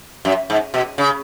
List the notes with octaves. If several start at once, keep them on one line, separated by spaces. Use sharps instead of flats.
F#2
G#2
B2
C#3